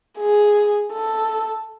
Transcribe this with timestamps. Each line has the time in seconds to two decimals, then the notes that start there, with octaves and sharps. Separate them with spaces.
0.19 G#4
0.93 A4